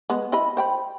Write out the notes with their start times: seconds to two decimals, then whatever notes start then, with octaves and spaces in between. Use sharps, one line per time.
0.10 G#3 B3
0.32 E4 D#5 B5
0.57 C5 G5 B5